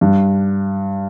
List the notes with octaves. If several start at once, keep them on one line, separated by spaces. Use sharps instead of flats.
G2